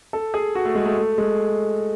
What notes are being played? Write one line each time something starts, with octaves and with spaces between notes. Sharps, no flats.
A4
G#4
F#4
A3
G#3
A3
A3
G#3